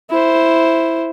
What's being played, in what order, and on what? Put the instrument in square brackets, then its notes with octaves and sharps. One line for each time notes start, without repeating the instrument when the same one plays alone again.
[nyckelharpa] E4 C5